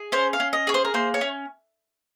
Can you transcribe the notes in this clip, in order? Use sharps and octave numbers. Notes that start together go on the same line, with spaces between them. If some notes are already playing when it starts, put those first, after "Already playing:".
Already playing: G#4
C#4 C5
F5
C#4
D#5
G#4 C#5
C5
A#4
A#3 C5
C#5
C#4